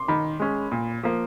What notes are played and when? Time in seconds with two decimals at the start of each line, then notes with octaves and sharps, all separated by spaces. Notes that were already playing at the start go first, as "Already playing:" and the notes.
Already playing: C6 D6
0.08 D#3 B5
0.40 G#3 C#4
0.72 A#2
1.03 F3 A#3